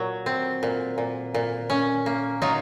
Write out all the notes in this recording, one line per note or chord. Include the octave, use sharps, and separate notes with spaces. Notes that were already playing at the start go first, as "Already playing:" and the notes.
Already playing: A#2 F#3
C4
A#2
A#2
A#2
C#4
A#3
F#3 D#4 F4